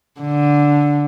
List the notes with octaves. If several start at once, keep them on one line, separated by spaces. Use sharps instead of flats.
D3